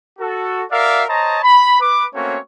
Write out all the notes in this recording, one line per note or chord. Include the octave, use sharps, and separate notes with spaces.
F#4 A4
F#4 A#4 D5 E5 F5
C5 C#5 D#5 A5 A#5
B5
B4 D6
A3 A#3 C4 C#4 F#4 C#5